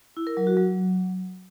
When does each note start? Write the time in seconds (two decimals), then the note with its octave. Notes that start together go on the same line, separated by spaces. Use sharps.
0.17 E4
0.27 A#4
0.37 F#3
0.47 F#4
0.57 F#3